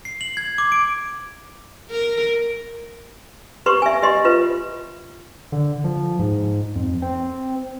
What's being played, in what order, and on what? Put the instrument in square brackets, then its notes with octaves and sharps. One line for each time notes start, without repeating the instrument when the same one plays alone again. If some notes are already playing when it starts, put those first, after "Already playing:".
[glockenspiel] C7
F#7
G#6
D6
D7
[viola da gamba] A#4
[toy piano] G4 B4 C6 C#6
E5 G#5
G4 D#5 C6
F4 B4
[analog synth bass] D3
F3
G#2
F2
C4